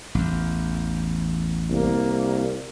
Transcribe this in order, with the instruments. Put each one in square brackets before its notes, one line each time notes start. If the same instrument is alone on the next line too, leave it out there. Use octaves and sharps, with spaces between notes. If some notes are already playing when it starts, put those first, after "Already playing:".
[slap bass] A1 E2
[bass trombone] C2 [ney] A#3